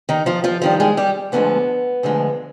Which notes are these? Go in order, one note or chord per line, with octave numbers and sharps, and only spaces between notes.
D#3 D#4
F3 F4
F3 F4
G2 D#3 F3 G3 F4
G#3 G#4
G3 G4
D2 D3 F3 G#3 B3
D2 D3 F3 G#3